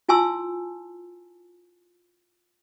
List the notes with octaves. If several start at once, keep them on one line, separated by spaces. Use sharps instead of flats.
E4 F4 G#5 A5 C6 E6